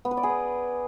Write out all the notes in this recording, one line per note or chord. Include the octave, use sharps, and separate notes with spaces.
B3
B4
D5
G#4
B3